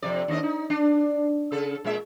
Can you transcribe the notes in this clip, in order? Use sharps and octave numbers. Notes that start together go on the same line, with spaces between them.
F2 C3 D5
D#2 D4 D#5
D#4
D4
C#3 A4
A#2 G#3 E5